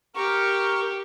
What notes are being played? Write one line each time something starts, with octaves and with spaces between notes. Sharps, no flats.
G4 A#4 C#6